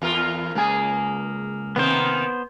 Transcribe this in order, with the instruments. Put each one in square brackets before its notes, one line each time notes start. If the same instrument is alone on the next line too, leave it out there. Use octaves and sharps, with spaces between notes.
[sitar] E2 F4 A#4
[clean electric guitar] C#2 G#5 [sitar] A#3 G#4
[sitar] C3 D#3 A#3 [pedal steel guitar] B3 C5